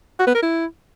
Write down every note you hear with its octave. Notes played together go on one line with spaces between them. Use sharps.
F#4
B3
A#4
E4